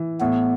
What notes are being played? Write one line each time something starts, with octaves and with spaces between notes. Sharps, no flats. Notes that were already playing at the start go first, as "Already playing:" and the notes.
Already playing: E3
A2 B3